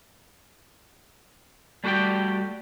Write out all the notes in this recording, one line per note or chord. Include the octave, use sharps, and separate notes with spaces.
G3 A3 F#4 G4 D5 G5